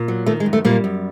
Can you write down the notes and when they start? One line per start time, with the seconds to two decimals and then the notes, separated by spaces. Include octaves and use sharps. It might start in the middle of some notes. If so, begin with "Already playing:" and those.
Already playing: A#2
0.08 F#3
0.26 D#3 A3
0.40 G#3
0.46 F#2
0.53 A3
0.65 A#2 G3 A#3
0.84 F#2